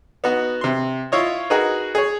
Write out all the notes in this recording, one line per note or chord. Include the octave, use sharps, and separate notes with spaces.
B3 D#4 F#4
C3 C6
E4 F4 C#5 D#5
D#4 F#4 G#4 A#4 B4
G#4 C#5